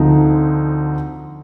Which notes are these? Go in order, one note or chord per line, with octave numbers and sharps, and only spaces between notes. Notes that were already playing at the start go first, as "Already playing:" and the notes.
Already playing: D2 D3 F3 C4 D#4